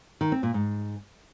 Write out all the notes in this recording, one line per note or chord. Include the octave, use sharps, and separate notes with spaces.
D#3
C4
A#2
G#2